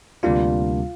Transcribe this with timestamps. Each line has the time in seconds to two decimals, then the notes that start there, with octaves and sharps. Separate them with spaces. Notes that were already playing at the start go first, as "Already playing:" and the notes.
0.23 D2 C3 G3 A#3 D4 F4